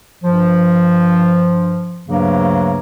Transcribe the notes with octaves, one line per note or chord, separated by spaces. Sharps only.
G2 F3
D2 G2 C#3 F#3 A#3